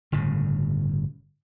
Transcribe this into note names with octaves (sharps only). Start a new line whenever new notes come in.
G1 A2 C#3